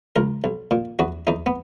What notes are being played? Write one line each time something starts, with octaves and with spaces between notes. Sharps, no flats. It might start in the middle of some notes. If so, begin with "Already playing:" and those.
C#2 A#4
B1
A#2
E2 F#4
E2 D#4
B3